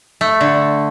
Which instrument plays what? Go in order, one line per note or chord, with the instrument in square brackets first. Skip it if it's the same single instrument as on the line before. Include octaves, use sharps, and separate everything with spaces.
[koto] A3
D3